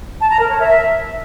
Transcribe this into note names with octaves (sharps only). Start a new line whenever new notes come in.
A5
A#5
A#4
C#5
E5